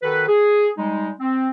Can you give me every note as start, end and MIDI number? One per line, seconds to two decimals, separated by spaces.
0.03 0.26 51
0.03 0.26 66
0.03 0.26 69
0.03 0.26 71
0.28 0.70 68
0.78 1.11 55
0.78 1.11 56
0.78 1.11 63
1.20 1.50 60